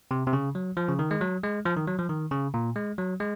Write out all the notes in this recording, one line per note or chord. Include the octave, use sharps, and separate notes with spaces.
C3
C3
C#3
F#3
F3
C#3
D#3
G#3
F#3
G#3
F3
D#3
F#3
F3
D#3
C#3
A#2
G#3
F#3
G#3